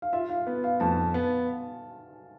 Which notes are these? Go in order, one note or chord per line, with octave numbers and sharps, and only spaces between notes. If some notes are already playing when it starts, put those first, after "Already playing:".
F5
F4 E5
F5
B3
F5
F2 A5
B3